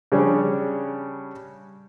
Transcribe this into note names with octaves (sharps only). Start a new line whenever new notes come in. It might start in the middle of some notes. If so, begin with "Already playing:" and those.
C#3 G3 C#4 D4